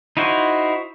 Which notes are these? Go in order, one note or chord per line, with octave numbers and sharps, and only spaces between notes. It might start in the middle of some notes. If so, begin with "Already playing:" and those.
D#4 E4 F#4 C5